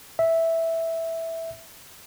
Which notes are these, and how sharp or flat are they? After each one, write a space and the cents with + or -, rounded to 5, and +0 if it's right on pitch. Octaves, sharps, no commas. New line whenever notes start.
E5 -5